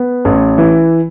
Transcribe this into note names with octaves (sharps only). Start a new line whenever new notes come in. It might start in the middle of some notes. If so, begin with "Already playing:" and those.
Already playing: B3
A1
E3